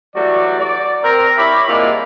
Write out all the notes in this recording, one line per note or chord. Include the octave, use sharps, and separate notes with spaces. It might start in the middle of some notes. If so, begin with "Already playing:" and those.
E3 F#3 G3 A3 F#4 D5
D5
C4 A#4 A#5
E4 G4 C#5 D5 E5 B5
C3 G3 G#3 A#3 E4 F4